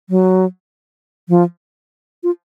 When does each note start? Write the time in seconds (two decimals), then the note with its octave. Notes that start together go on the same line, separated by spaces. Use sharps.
0.10 F#3
1.29 F3
2.23 F4